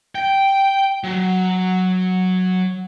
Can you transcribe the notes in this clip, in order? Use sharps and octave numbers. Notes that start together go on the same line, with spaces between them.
G5
F#3